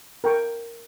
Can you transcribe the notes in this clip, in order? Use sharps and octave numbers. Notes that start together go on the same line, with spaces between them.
A#4 G5 C#6